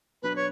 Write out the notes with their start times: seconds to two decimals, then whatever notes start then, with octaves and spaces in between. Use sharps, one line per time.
0.22 B2 F#3 B3 D4 B4
0.36 C#5